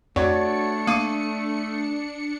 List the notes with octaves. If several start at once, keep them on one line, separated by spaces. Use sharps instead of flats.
F2 A3 D4 F#4 C#5 D5 C#7
A#3 D#6 D#7